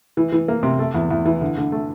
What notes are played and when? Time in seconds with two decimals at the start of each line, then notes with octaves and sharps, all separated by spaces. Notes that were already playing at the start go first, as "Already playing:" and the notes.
0.17 E3
0.32 E3
0.48 A#3
0.63 C3
0.79 A3
0.95 E2
1.11 E2
1.25 E3
1.41 D3
1.58 D3
1.72 A3